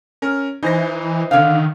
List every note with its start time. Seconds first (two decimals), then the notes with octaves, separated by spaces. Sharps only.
0.22 C#4 A#4
0.63 E3 D#4 C5 A#6
1.31 D3 D#3 F5